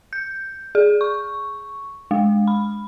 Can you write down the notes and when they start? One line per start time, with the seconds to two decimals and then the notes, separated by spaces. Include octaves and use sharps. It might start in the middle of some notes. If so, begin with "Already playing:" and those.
0.13 G6
0.75 G#4
1.01 C#6
2.11 G#3
2.48 B5